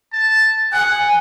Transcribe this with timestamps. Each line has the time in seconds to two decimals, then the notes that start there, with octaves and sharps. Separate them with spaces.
0.13 A5
0.73 F#5 G#5